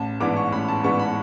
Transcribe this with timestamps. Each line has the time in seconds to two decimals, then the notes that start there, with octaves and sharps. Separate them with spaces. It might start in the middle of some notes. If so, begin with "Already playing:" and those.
Already playing: A1 A5
0.20 G#2 E3 B3 D4 D6
0.36 C#6
0.52 A1 B5
0.68 A5
0.83 G#2 E3 B3 D4 C#6
0.99 B5